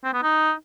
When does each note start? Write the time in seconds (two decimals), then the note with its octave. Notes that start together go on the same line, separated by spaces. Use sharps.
0.04 C4
0.13 B3
0.22 D#4